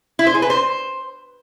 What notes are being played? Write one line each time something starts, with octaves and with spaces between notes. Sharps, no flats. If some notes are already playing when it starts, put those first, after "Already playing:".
E4
C5
G#4
B4
C5